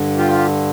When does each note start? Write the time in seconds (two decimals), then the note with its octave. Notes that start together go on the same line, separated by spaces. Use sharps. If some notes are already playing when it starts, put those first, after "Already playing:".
Already playing: G2 D3
0.18 F4 G4